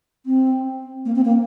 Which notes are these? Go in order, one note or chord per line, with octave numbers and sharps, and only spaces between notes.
C4
A#3
C4
A#3